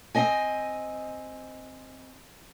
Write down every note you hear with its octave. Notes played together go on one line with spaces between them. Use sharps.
C4 D#5 G#5